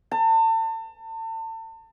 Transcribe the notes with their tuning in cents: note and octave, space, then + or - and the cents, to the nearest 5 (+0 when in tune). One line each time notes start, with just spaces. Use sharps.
A5 +35